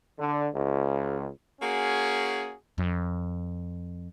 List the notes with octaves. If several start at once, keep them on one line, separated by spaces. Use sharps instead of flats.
D3
C#2
A#3 C#4 F#4 G#4
F2